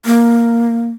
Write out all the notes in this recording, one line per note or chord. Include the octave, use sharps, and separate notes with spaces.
A#3